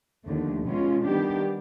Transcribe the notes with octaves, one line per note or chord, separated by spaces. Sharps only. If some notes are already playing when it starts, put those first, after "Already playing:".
D#2 D3 F3 A3
B2 G#3 C#4 F4
D#3 G3 B3 D4 G4